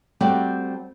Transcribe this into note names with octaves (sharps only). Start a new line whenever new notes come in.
G3 A3 C4 F#4 A4 D5